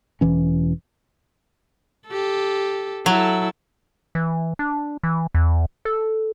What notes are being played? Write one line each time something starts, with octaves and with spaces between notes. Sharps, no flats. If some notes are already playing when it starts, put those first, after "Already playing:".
E1 E3 C#4
G4 A4
F#3 E4 A4
E3
D4
E3
E2
A4